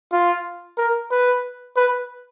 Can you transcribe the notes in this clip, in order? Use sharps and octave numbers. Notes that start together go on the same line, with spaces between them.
F4
A#4
B4
B4